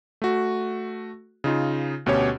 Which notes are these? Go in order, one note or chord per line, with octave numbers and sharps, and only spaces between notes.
A3 F#4
C#3 D#4 F4
D2 B2 C#4 G4 C#5